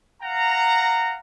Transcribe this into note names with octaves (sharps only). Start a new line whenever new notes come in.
F5 F#5 A#5